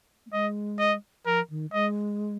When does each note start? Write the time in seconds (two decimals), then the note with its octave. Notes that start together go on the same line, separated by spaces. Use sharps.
0.26 A#3
0.32 G#3 D#5
0.79 D#5
1.26 F3 A#4
1.50 D#3
1.73 G#3 D#5